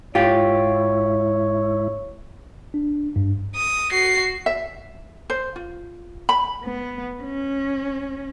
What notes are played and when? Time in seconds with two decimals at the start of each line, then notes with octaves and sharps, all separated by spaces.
0.15 G#2 E4 F4 G4 C#5
2.74 D4
3.16 G2
3.55 D#6
3.91 F#4 C7
4.46 E5
5.30 C5
5.56 F4
6.29 B5
6.64 B3
7.23 C#4